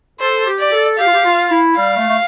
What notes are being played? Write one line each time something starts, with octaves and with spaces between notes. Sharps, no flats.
A4 C5
G4
D5
A4
G4 F5
F4
G4
F4
E4
G3 F5
A3
A3